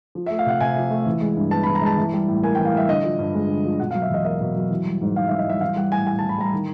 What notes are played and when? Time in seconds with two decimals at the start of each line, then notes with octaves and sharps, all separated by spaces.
0.15 F3
0.26 E5
0.30 A3
0.39 F5
0.46 C3 F#5
0.61 C3 G#5
0.77 F3
0.91 A3
1.06 E3
1.21 G#3
1.37 G2
1.51 B3 A5
1.63 B5
1.67 E3
1.75 A#5
1.82 G#3 A5
1.97 E3
2.13 G3
2.28 A2
2.43 A#3 G#5
2.55 G5
2.59 E3
2.65 F5
2.73 G3 E5
2.88 D3 D#5
3.03 F3
3.19 G2
3.34 G#3
3.49 D3
3.64 F3
3.80 B2 F#5
3.91 F5
3.95 F#3
4.02 E5
4.10 E2 D#5
4.25 A#3 D#5
4.41 B2
4.56 F#3
4.71 E3
4.86 G3
5.02 G#2
5.16 G#2 F5
5.27 E3 E5
5.39 D#5
5.47 G3 E5
5.61 E3 F5
5.76 G3 F#5
5.91 A2 G#5
6.07 A2 G#5
6.19 A5
6.23 E3
6.29 B5
6.38 G3 A#5
6.53 D#3